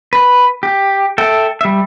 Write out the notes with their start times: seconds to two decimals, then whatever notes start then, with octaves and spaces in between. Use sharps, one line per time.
0.13 B4
0.63 G4
1.18 A4 E5 G5
1.61 G3 E5